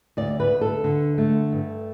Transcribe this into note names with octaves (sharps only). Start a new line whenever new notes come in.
D2 D5
B4
D2
A4
D3
A3
G2